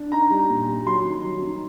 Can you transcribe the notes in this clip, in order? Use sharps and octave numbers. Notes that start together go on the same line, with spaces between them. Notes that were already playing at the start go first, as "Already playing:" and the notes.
Already playing: D4
D#4 A#5
G3
A#2
G3
F#3 C6
D#3
F#3
D#3